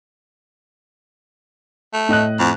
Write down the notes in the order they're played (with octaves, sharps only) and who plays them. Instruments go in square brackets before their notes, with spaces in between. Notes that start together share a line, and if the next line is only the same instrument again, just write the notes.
[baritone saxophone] A3
[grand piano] A2 D#5 F#6
[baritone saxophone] F2